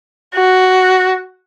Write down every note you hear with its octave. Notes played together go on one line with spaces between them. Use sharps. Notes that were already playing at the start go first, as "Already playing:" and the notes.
F#4